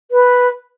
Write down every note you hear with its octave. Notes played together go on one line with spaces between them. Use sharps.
B4